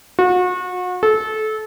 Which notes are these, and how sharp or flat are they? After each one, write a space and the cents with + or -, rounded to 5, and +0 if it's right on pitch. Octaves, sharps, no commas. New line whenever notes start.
F#4 -35
A4 -25